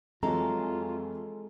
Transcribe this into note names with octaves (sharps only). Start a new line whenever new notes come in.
F2 E3 F#3 G#3 F4 A4 A#5